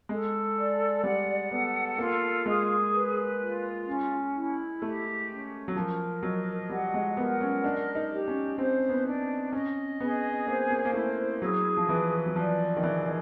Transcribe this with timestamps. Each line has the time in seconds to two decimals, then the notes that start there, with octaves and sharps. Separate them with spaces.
0.09 G#3 A4
0.57 D5
1.04 G3 F#5
1.51 B3 A4
1.99 A#3 F4
2.45 G#3 G#4
2.93 B4
3.39 F4
3.87 C#4
4.34 E4
4.81 A3 G4
5.29 C#4
5.68 F#3
5.75 F3 A#4
6.23 F#3 D#5
6.70 G3 F#5
6.94 G#3
7.17 B3 A#4
7.41 C#4
7.64 D4 D#5
7.95 D#4
8.12 G4
8.28 C#4
8.58 C4 C5
8.89 B3
9.06 D4
9.53 C#4 D#5
10.00 B3 G#4
10.47 A#3 C5
10.70 A#3
10.85 A#3
10.94 A3 E4
11.42 F#3 G#4
11.77 F3
11.89 E3 B4
12.26 F#3
12.36 F3 D5
12.77 D#3
12.83 E3 G#4
13.06 D#3